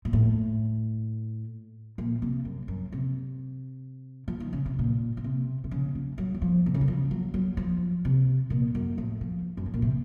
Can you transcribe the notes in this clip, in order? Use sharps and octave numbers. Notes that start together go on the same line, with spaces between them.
A#2
A2
A#2
C3
F#2
F#2
C3
F3
D#3
C#3
C3
A#2
C#3
C3
C3
C#3
F3
F#3
D#3
F3
C3
C#3
D#3
F3
F#3
F#3
F3
C3
A#2
F#2
A2
F3
F#2
A2
A#2
C3